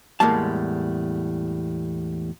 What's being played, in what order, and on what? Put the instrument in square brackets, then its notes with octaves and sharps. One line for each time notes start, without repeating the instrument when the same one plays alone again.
[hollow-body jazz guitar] E2 A2 G3 G#3 A#3 A5